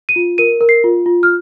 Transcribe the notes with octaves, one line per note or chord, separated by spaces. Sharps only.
D#7
F4
A#4 D#7
A#4
C7
F4
F4
F6